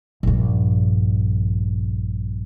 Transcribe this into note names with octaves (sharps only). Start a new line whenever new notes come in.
A#1 G2